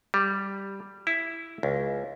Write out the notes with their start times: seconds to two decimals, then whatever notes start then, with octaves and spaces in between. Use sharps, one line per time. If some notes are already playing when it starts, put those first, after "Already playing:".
0.14 G3
1.07 E4
1.63 C#2